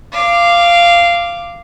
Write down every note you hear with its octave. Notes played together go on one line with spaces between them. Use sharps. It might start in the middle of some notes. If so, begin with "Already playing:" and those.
F5 D6